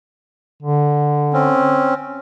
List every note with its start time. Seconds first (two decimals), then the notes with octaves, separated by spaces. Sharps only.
0.63 D3
1.33 C4 C#4